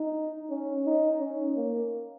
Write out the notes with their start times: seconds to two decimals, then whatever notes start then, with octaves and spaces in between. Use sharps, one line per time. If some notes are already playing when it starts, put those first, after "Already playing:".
Already playing: D#4
0.50 C#4
0.86 D#4
1.20 C#4
1.56 A#3